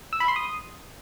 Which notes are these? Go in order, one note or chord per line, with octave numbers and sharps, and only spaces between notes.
E6
B5
C6
D#6